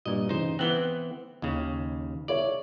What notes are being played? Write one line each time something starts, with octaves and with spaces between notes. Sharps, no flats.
G2 A#2 D#5
C#3 E3 D#4 C5
E3 B3 C4 F#6 F#7 G7
D#2 C#3 D#4
G#4 C#5 D5 E5